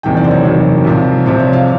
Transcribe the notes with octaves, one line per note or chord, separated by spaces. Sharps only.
F#1 E2 C3 D#3 F#3 G5
D5
C5
C#5
F#1 E2 C3 D#3 F#3
C2 C3 F3
C2 C3 F3 C5
C#5
F5